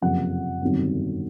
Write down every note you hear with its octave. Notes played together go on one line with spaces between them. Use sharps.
F#1 F2 C3 F3 F#5
G1 F2 C3 D#3 F#3